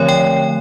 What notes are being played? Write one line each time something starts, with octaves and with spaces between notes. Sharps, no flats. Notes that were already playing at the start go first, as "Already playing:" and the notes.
Already playing: D3 F3 A3 C4 C#5
G5